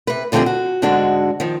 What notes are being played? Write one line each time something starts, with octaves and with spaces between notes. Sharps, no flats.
C3 B4
E2 D3 F3 C4 G4 G#4
F#4
G#2 D3 G#3 D4 F#4
D#3 F3